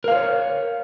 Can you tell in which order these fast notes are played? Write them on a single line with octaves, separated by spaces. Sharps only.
A#4 F5 C5 C#5